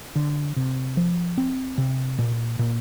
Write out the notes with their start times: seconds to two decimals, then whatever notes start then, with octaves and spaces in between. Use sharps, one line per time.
0.16 D3
0.56 C3
0.97 F3
1.38 C4
1.78 C3
2.18 A#2
2.59 A#2